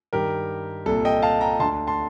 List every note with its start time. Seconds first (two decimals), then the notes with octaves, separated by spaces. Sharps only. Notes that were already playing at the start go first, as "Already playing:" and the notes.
0.13 G2 D#3 G4 A#4
0.86 C2 A#2 A4
1.05 D#5 G5
1.22 F5 A5
1.41 G5 A#5
1.59 D2 A5 C6
1.63 D3
1.87 A5 C6